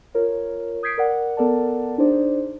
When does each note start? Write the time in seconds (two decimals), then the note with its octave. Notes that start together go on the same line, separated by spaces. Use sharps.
0.14 F4 A#4 C#5
0.83 D#6 G6 G#6 B6 C7 D7
0.98 A#4 D5 F#5
1.37 B3 A4 A#4 D5 F#5 A5
1.98 D4 D#4 G#4 C5 D5